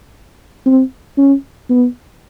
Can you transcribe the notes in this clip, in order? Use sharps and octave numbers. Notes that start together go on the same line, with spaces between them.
C4
C#4
B3